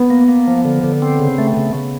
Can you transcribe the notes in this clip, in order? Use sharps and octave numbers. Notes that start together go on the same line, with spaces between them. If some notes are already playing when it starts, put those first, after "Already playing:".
Already playing: B3
A#3
A#3
F3
D3
D3
C4
C#3
A3
C#3
C#3